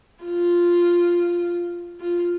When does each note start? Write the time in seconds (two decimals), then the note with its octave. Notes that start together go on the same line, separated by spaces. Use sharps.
0.24 F4
2.00 F4